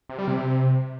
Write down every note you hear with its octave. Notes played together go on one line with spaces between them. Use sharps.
C3
G3
C3